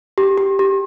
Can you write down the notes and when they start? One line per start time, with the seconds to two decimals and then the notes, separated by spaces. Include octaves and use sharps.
0.18 G4
0.38 G4
0.59 G4